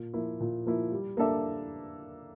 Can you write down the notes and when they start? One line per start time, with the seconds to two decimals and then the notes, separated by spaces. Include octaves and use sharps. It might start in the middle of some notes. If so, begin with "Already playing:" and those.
Already playing: A#2
0.14 F3 A#3 E4
0.40 A#2
0.66 F3 A#3 E4
0.92 G3
1.17 A#3 D4 A4 E5